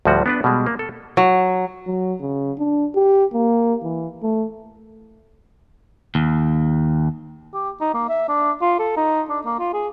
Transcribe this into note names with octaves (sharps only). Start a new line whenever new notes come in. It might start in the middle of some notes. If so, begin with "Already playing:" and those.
D2 A2 F3 G3 F#4
B3 D4 B4
B2 G3 G#3
A#3
A4
F#3
F#3
C#3
D4
G4
A#3
E3
A3
D#2
G4
D#4
A#3
E5
D4
F4
A4
D#4
D4
A#3
F4
G#4